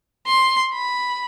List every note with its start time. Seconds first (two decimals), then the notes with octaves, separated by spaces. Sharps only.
0.27 C6
0.74 B5